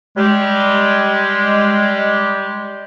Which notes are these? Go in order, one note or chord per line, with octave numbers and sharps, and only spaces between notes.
G3 G#3 G4